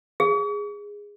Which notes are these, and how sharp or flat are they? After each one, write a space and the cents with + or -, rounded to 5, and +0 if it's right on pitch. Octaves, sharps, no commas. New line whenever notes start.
G#4 -15